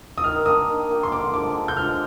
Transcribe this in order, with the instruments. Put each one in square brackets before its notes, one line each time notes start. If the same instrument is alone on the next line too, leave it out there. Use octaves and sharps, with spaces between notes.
[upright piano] D#6
[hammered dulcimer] D#3 [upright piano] F6
[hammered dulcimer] A#3 D4 G4 [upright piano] D#6
[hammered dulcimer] D#3
A#3 D4 G4
[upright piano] C6
[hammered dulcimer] D3 [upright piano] D6
[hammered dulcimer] F3 G#3 D4 [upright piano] D6
[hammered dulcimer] D3
[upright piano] G6
[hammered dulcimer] F3 G#3 D4 [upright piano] F6